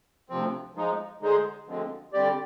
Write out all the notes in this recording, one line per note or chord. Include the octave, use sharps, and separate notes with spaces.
D2 C3 F3 C4
F3 G#3 D#4
D3 G#3 D#4 G#4 C5
D2 D3 F3 G#3 C4
D3 G3 C4 G4 D5